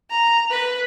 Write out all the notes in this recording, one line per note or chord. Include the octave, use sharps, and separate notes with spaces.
A#5
B4